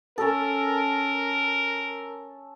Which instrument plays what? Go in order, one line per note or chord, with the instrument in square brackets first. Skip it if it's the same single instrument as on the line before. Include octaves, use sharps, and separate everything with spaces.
[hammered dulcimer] C#4 A4 [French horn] A#4